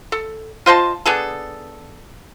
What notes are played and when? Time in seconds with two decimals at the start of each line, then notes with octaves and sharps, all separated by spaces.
0.12 A4
0.66 F4 C5 D#5 A5
1.06 B3 D4 G#4 A4